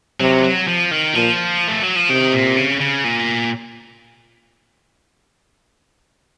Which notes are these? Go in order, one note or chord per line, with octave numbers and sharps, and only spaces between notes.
C3 F#3
F#3
F3
D#3
A#2 F3
A3
F#3
F3
C3 D#3
A#2
C#3
C#3
A#2